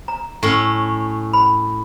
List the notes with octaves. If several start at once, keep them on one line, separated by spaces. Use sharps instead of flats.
A#5
A2 C#4
B5